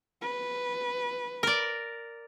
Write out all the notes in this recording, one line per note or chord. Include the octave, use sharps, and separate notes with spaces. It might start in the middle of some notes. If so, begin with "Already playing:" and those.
B4
A#4 D5